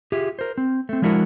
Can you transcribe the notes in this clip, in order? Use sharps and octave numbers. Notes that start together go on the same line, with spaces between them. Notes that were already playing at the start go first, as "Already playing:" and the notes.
F4 G4 G#4 E5
A#4 C5
C4
A3 C4
F3 G#3 D4 E4 F#4 A#4